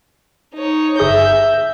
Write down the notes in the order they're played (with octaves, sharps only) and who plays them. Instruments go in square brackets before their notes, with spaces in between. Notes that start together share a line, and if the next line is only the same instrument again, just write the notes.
[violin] D#4 C#5
[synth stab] G1 G#4 A#6 [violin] E5 G6